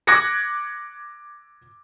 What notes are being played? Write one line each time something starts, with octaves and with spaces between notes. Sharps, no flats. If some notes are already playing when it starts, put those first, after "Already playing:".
D6 F#6 G#6 A#6 C#7